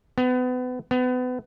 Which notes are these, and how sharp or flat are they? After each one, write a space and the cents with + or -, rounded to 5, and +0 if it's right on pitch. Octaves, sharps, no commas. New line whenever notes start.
B3 +30
B3 +30